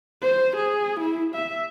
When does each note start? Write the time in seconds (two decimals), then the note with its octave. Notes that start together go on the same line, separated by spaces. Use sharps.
0.22 C5
0.56 G#4
1.00 E4
1.35 E5